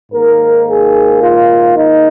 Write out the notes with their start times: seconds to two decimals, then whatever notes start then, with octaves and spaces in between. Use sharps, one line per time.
0.12 G#2 D#3 A#3 A#4
0.67 G#4
1.21 F4
1.76 D#4